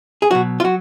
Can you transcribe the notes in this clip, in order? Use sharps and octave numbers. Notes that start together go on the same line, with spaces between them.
G#4
B2 F#3 F#4
F4
F#3 F#4